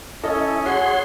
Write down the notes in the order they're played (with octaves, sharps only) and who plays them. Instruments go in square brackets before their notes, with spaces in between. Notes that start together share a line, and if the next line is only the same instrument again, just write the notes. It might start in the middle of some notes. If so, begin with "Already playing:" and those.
[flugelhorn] C#4 [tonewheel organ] E4 [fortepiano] A4 D#5
[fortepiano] F#4 [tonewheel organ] G#4 C6 [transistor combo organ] C#5 F#5